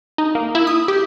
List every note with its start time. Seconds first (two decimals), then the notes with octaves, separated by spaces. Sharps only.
0.18 D#4
0.35 A#3
0.55 E4
0.67 D#6
0.88 G4